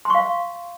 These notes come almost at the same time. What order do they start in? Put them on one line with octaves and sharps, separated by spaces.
C6 C#6 F5